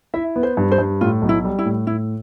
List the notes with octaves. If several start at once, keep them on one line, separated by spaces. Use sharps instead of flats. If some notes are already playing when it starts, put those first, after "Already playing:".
E4 E5
B3
C5
G2
C5
G2
A2 F4
B1
E4
G3
E4
A2
A2 E4